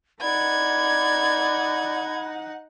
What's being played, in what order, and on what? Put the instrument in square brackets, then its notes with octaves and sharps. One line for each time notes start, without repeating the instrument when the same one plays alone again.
[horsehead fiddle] D#4 F#5 [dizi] D5 [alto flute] B5 [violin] G#6